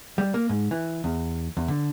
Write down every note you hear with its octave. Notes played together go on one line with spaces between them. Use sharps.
G3
A#3
G#2
E3
E2
E2
D3